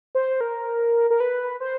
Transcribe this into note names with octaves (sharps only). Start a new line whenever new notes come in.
C5
A#4
A#4
B4
C5